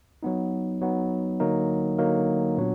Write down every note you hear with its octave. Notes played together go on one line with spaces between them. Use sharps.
F#3 B3 D#4
F#3 B3 D#4
D3 F#3 A#3 D#4 A#4
D3 F#3 A#3 D#4 A#4
A#2 F#3 B3 D4